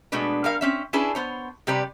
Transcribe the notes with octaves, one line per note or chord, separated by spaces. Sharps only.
B2 G#3 A3 D4 B4
G3 A#4 F5
C4 C#4 E5
C#4 D4 E4 G#4 B4 A5
B3 C5 C#5
C3 G3 G4 B4 D5